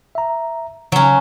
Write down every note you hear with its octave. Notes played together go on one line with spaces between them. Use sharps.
E5 A#5
C#3 F#3 C#4